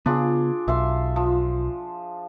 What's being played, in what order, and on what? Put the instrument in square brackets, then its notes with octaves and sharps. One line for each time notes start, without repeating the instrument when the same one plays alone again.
[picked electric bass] C#3 B3 [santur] D4 F4 G#4
[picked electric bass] B1 [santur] E5 F5 C6
[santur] F3